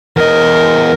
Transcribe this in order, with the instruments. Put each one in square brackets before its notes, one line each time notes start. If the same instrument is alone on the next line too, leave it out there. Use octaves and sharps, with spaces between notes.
[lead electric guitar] E2 D#5 [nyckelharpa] A#4